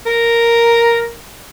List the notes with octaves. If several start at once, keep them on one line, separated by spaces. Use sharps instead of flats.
A#4